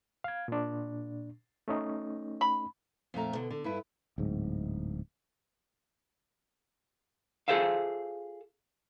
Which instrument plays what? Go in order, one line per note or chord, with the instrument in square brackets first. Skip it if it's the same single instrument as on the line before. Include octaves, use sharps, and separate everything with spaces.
[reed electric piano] F5 G#6
A#2 D4
A3 C#4 D#4
[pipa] B5
[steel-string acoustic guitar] F2 A#2 A3 A#5
B2 D3
D3
G2 E4 B4
[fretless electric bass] D1 G#2
[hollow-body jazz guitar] F4 G#4 A4 C5 E5 F5